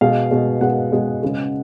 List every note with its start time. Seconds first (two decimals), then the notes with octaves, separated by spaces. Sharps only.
0.01 B2 G#3 F5
0.31 B2 G#3
0.61 B2 G#3 F#5
0.92 B2 G#3
1.23 C#3 G#3